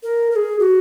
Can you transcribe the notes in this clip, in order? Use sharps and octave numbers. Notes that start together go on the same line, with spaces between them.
A#4
A#4
G#4
F#4